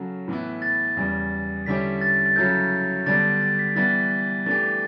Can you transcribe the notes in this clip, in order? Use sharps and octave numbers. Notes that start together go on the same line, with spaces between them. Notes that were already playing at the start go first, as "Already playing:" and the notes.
Already playing: C#3 F#3 C#4 F#4 A4
A2 E3 B3 E4
A6
E2 C#3 G3
D3 G3 C#4 E4 G4 B6
A6
A6
C#3 F#3 C#4 E4 A4 G6
D3 G3 B3 D4 A6
A6
B6
E3 G3 B3 E4 A6
E3 A3 D4 G4 A6